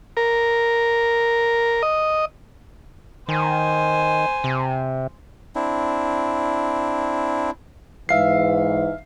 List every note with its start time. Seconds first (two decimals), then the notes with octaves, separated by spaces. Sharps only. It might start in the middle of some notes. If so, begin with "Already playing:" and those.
0.17 A#4
1.83 D#5
3.28 D#3 C5 G#5
4.44 C3
5.55 C4 D4 E4
8.09 G#2 E3 E5 F5 C7